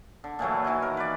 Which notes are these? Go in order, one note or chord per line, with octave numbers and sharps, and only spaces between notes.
D3
A#2 E3 F#3 A3
D#3 E3 F#3 G#5
A#4
B4 D5